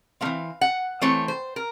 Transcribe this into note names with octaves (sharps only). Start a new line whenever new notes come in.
E3 A3 C4 F5
F#5
E3 A3 C4 C#5
C5
A#4